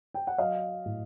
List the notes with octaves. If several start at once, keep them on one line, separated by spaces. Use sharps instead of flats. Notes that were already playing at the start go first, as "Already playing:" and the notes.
G5
F#5
F#3 D#5 F5
A2